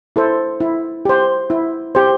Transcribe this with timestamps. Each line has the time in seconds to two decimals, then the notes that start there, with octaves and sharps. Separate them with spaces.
0.16 E4 A4 C5
0.60 E4
1.05 G4 C5
1.50 E4
1.95 G4 C5